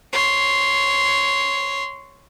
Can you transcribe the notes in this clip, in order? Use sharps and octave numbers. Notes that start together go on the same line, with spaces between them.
C#5 C6